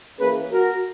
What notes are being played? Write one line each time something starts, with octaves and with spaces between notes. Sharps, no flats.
E3 A#3 C#4 G#4 B4
F#4 A#4